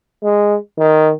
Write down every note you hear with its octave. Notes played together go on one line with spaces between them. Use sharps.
G#3
D#3